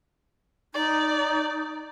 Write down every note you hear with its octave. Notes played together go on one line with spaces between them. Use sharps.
D#4 D5